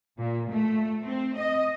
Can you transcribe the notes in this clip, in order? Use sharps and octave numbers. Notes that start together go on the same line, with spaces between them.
A#2
A3
C4
D#5